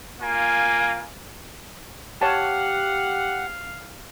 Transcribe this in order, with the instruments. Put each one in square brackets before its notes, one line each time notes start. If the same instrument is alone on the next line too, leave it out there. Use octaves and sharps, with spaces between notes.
[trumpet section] A#3 F4 G#5
[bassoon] G4 [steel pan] C#5 A5 [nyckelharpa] F5 [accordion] F#5